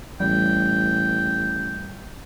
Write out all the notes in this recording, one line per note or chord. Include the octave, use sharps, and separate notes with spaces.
A1 G3 G5